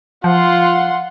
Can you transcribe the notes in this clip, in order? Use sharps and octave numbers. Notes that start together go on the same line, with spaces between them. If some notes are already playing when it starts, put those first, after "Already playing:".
F3 F4 F#5 C6